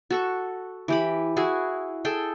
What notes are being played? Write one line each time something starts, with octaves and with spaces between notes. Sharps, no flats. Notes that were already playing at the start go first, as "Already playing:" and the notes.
F#4 A4 C#6
E3 G4 B5
E4 F#4 G#4
G#4 A4 G5